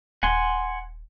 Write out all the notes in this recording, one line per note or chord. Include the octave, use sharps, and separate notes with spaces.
D#1 F#5 G#5 C6